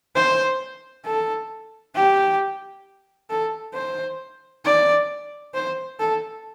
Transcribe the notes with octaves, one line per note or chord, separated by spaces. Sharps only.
C5
A4
G4
A4
C5
D5
C5
A4